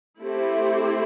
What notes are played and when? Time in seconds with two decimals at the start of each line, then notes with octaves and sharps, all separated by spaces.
0.21 A3 C4 E4 G4 A4 C5